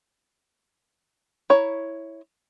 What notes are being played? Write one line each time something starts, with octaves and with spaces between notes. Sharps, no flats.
E4 C#5 A#5